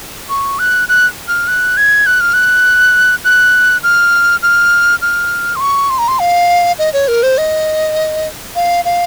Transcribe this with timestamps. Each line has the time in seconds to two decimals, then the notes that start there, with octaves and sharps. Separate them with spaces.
0.29 C#6
0.59 F#6
0.89 F#6
1.28 F6
1.48 F#6
1.77 G#6
2.06 F#6
2.21 F6
2.34 F#6
3.25 F#6
3.83 F6
4.43 F6
5.02 F6
5.56 C6
5.61 C#6
5.90 C6
5.99 A#5
6.08 C6
6.19 F5
6.79 D#5
6.93 C#5
7.08 A#4
7.23 C5
7.38 D#5
8.56 F5
8.85 F5